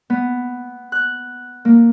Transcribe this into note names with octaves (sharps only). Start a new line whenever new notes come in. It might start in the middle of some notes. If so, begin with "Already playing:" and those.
B3
F#6
A#3